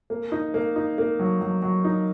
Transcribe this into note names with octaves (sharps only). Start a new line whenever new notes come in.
A#3
D#4
A#3
D#4
A#3
F#3
F#3
F#3
D#4